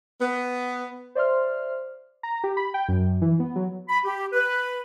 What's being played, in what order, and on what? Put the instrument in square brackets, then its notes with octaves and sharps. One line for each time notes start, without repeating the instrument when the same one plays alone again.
[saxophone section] B3
[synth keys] C5 D5 E5 C6 F6
A#5
G4
B5
G5
F#2
E3
B3
F#3
[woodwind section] B5
G4
B4